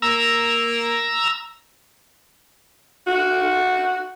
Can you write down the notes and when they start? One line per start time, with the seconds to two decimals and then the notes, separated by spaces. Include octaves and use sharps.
0.02 A#3 A#5 E6
3.07 F#4